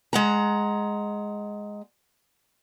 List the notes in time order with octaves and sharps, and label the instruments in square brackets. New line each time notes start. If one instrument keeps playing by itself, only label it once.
[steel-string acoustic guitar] G#3 F#5 A#5